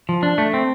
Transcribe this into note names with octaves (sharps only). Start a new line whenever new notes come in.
F3
D4
A3
C4